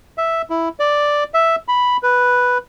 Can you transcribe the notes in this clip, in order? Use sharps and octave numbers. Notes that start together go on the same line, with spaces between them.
E5
E4
D5
E5
B5
B4